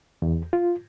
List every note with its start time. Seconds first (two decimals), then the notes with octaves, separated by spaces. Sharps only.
0.22 E2
0.53 F4